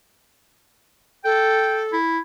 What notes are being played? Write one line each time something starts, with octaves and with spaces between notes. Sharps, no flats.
A4 G5
E4